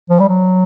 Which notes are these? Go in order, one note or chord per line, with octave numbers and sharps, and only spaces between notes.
F3
G3
F#3